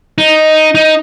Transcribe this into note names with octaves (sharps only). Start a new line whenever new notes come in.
D#4
D#4